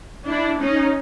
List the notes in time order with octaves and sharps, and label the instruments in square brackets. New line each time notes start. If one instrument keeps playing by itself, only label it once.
[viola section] D4 E4
C#4 D#4